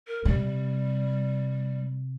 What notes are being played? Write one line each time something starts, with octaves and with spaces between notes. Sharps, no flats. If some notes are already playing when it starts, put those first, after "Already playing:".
A#4
C3 G3